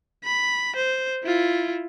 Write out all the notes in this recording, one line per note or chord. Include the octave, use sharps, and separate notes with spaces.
B5
C5
E4 F4